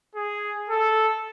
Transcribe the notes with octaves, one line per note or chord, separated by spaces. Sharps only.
G#4
A4